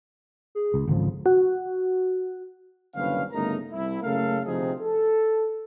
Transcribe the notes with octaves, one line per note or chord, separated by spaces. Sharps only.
G#4
C#2
G#1 C#2 D3 F3
F#4
F#1 C2 D3 C#4 B4 F5
G1 C#3 A3 D#4 A#4 A#5
C2 E4
F#1 C#3 A3 A4 A#4 F5
D2 C3 F3 C4 D#4 G#4
A4